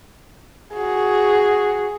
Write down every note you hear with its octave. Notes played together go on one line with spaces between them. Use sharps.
F#4 G#4